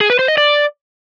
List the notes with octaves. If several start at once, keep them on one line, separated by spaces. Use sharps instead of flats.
G#4
B4
C5
D#5
D5